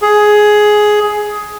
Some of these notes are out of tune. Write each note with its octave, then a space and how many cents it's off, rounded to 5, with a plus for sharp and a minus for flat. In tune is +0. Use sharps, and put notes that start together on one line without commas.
G#4 +10